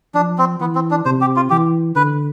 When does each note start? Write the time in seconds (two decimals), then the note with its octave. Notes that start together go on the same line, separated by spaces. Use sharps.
0.14 F3 D4
0.38 C4
0.60 E3 B3
0.75 C4
0.91 D4
1.05 C3 C5
1.21 G4
1.36 F4
1.50 E3 G4
1.96 D3 B4